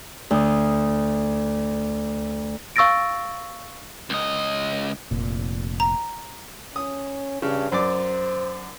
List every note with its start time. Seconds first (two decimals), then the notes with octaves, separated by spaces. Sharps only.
0.31 D2 D#6
2.76 F5 C#6 E6 A6 A#6 D7
4.10 C#2 D#5
5.11 F1 A#2
5.80 A#5
6.76 C#4 D#6
7.42 G2 C#3
7.72 F#2 C5 D5 D6